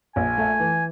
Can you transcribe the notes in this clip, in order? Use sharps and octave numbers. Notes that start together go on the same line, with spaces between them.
A#1 G#5
A3
E3